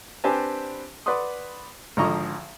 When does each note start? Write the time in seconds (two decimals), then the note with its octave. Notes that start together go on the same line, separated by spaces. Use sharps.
0.24 C4 D4 G4 B4 G#5 A5
1.06 B4 D5 F#5 C6 D#6
1.97 G#1 D3 F3 D#5 A#5 C#6